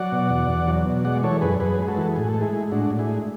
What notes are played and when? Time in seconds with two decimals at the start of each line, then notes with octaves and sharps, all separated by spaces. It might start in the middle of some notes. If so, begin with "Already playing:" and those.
Already playing: F#3 D5 F#5
0.12 B2
0.30 E2
0.49 E2
0.68 F#3
0.85 B2
1.05 G#3 D5 F#5
1.23 E3 A4 C#5
1.41 F#2 G#4 B4
1.60 F#2 G#4 B4
1.79 G#3 G#4
1.88 F#4 A4
1.97 E3
2.16 A2 G#4
2.28 A4
2.34 G#3
2.41 E4 G#4
2.52 G#3
2.71 A2 D4 F#4
2.90 A2
2.99 E4 G#4
3.09 G#3